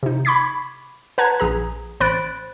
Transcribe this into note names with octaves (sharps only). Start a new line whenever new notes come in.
C3 D#4
B5 C#6 D6 G#6 B6
B4 F#5 A5 A#5 F#6 G#6
A#1 G#4 A#5
A1 C5 B5 F#6 A6 D7